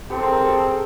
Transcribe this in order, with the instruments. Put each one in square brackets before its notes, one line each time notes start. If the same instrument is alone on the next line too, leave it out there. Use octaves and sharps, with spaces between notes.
[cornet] C4 [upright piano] G4 A4
[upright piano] G#4 A#4
G#4 A#4
G4 A4
G#4